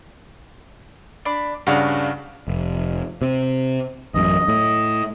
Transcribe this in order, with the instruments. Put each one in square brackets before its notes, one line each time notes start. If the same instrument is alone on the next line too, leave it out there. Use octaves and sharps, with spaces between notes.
[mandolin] D4 D5 B5
[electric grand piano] G2 C#3 D4 [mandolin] F#4 F5
[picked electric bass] F1
C3
[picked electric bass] A1 F#2 [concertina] D#5
[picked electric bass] A2